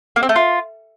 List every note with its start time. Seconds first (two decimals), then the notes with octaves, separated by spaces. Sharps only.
0.16 A#3
0.23 C4
0.29 A3
0.36 F4